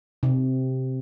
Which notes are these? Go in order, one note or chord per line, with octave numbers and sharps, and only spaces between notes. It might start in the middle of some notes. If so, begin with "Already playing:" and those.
C3